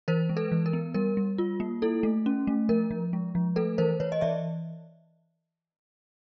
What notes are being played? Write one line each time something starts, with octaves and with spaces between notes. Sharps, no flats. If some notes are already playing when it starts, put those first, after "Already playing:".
E3 A#4 C5
G#3
A4 B4
E3
A#4
B3
G3 A#4
G3
F4
A#3
E4 A4
A3
C#4
A3
F3 A#4
F3
G#3
F3
A3 A4 B4
E3 A#4 C5
E3 B4 C#5
D#5
E3 D5 E5